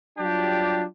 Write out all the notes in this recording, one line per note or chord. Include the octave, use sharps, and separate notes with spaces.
F#3 G3 D4 F4 G4